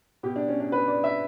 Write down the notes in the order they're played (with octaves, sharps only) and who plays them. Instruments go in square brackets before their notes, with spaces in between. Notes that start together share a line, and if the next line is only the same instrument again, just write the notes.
[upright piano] B2 G4
D4
C#4
D4
B4
D5
E5